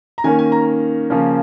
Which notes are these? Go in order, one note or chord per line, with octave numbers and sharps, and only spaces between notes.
A#5
D#3 A#3 C#4 G#5
G#5
A#5
C#3 F3 A#3 C#4